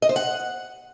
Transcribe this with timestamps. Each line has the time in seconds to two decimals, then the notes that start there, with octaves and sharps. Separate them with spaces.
0.02 D#5
0.09 C5
0.16 F#5